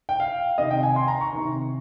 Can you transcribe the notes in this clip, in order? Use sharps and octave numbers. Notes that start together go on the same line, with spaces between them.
G5
F5
C3 D#3 D#5
G5
G#5
C6
A#5
C#6
C3 D#3